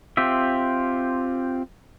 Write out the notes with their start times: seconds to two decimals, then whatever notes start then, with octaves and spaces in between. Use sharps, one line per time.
0.17 C4 F4 G4 E5